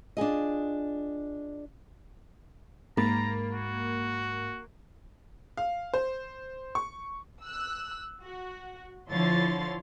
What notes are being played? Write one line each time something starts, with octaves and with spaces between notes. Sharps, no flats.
D4 F4 G#4 D#5
G#2 A#3 A#5 B5 A6
F#4
F5
C5
C#6
E6 F#6
F#4
D3 F3 E4 C#5 C6 A6